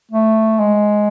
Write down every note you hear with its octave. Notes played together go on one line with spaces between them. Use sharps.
A3
G#3